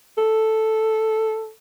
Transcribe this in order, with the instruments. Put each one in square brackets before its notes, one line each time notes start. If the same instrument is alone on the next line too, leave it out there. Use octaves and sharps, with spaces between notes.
[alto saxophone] A4